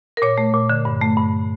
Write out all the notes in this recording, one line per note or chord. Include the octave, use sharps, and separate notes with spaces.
A#4
A#2 C#5
A3
A#2
D3
G2
A3
G2